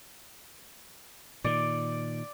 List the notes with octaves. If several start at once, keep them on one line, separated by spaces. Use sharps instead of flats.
A#2 D#3 D5